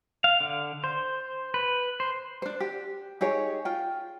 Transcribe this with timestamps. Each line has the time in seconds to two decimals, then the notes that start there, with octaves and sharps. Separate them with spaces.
0.24 F5
0.41 D3
0.84 C5
1.54 B4
2.00 C5
2.42 D4 C5
2.60 G4
3.21 D#4 G4 G#4 C#5
3.65 F4 G5